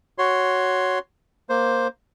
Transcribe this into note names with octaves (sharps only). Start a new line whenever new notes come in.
F#4 C#5 C6
A#3 C5